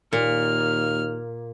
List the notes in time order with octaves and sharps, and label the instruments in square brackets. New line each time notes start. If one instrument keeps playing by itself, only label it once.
[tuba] D#2 [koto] A#2 [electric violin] F6